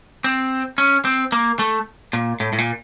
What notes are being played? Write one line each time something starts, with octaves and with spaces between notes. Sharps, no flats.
C4
C#4
C4
A#3
A3
A#2
A2
A2
A#2